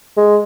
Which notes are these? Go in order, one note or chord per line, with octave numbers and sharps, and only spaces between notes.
G#3